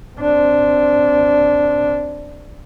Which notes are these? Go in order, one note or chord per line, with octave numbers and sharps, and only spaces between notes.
C4 D4